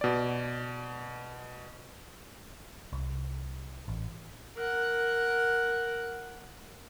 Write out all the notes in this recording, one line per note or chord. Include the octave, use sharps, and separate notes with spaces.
B2 D5
C2
A1
A#4 F#5